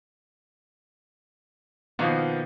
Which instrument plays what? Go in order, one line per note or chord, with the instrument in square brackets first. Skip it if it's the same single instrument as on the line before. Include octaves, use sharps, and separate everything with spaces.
[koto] B2 D#3 A#3 [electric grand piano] F3 B3